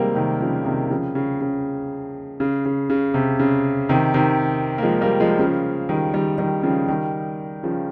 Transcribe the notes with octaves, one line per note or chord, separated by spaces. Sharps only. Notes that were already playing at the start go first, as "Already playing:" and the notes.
Already playing: C3 D#3 G3 G#3 A#3 C4
C3 D#3
C#3 F3
C3 D#3
C#3 F3
C#3
C#3
C#3
C#3
C#3
C3
C#3
C3 D#3
C3 D#3
A#3
F3 G#3
G3 A#3
F3 G#3
C#3 F3
D#3 G3
D#3 G3
D#3 G3
C#3 F3
D#3 G3
C#3 F3